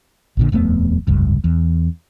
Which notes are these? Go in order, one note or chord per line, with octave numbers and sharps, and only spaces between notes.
A#1 A#2 D3
D#1 F2 A3 B3
F1 C#2 G2
E2